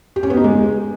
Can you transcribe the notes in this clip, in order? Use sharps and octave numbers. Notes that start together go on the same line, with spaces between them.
G4
C#4
B3
D#4
G#3